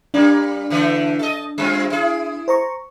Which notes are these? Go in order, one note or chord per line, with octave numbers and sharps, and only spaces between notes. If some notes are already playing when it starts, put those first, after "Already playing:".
G3 A#3 D4
D3 E3 A3
A4 D#5
G3 C4 F4
E4 G#4
C5 A#5 C#6